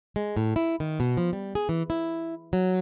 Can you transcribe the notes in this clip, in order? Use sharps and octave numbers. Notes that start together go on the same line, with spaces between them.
G#3
A2
E4
D#3
B2
F3
G3
G#4
E3
E4
F#3